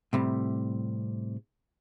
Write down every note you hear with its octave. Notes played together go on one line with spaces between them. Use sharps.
A2 C3 G3